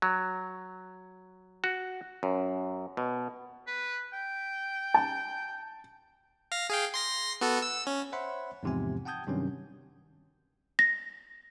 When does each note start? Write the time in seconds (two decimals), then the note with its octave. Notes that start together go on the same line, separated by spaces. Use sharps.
0.02 F#3
1.64 F#4
2.23 F#2
2.97 B2
3.67 B4
4.13 G5
4.94 A5
6.52 F5 A#6
6.70 G#4 F5 G5
6.94 C6 A#6 C7
7.41 B3 F#4 A4
7.62 E6
7.87 C#4
8.12 C5 C#5 E5 F#5 B5 C6
8.63 E2 G#2 C3 F3 G#5
9.05 F#5 G5 A5 D#6 G6 G#6
9.27 G2 C3 D#3 F#3 C#4
10.79 A#6